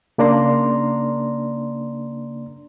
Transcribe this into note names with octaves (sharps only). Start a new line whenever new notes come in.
C#3 A#3 D4 D5 A#5 C6